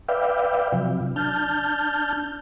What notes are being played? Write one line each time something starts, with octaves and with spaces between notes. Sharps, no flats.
B4 D5 E5 F5 G5
C3 F3 F#3
D4 A5 F6 G6